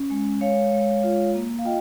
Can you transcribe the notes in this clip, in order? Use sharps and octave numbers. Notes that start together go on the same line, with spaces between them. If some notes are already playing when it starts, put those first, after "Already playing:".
Already playing: C#4
G#3
G#3 C#5 F5
G#3
F4
A#3
F5
F4 D#5 G5